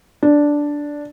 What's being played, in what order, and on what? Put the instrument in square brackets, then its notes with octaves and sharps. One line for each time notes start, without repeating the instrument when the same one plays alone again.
[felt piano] D4